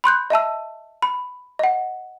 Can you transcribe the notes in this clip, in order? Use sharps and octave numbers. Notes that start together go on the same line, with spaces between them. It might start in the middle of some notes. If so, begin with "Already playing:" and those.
B5 C6 F#6 G6
D#5 E5 A5 E6
B5
D#5 F#5